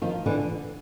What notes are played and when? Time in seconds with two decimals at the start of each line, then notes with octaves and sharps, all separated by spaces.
0.02 D#3 F3
0.26 D3 E3